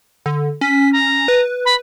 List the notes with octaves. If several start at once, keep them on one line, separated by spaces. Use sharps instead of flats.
D3
C#4 B6
A#5
B4
B5